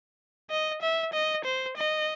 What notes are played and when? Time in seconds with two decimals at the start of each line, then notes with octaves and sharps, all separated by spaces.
0.50 D#5
0.82 E5
1.13 D#5
1.45 C5
1.77 D#5